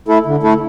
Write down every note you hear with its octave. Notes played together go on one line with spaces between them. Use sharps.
A3 E4 A4
D3
A3 E4 A4